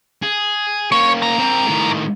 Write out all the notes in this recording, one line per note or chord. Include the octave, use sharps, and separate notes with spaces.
G#4
A#3 C#4 C#5
G#2 A#5
C4 A#4
A2 D#3